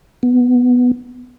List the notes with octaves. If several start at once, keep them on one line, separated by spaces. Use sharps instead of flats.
B3